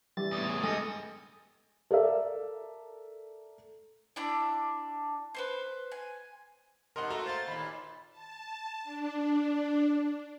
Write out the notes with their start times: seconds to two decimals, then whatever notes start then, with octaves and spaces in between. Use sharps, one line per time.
0.17 E3 G3 A6
0.32 E2 A2 D#6
0.49 G#4
0.63 G2 G#3 A4 G#5 D#6 A#6 C#7
1.91 A4 A#4 D5 E5
4.16 D4 E4 D5
5.34 B4 C5 C6
5.92 G#5
6.96 G#2 C3 A#4 D#5 F#5 C6
7.10 A3 A#3 F#4 A4 A#5
7.26 C5 F5 C6 A6
7.47 D#2 A#2 B5
8.10 A5
8.83 D4